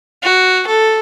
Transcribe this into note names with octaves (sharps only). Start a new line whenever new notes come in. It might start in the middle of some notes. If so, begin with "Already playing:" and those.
F#4
A4